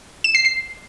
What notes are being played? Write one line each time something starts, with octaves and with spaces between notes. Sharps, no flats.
E7
C7
C7